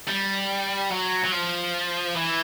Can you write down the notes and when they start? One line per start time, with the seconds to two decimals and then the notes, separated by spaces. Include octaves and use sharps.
0.08 G3
0.90 F#3
1.24 F#3
1.32 F3
2.15 E3